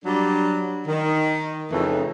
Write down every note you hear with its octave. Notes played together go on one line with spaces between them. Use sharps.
F#3 G3 D4
D#3
F2 C#3 E3 A3 D#4